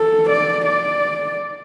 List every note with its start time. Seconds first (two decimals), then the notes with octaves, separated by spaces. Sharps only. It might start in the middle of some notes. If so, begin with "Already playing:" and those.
Already playing: A4
0.30 D5
0.66 D5